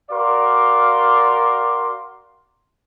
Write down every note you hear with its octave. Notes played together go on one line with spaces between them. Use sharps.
F#4 A#4 D5 F5 C6 D6